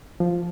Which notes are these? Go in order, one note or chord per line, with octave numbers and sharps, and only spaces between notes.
F3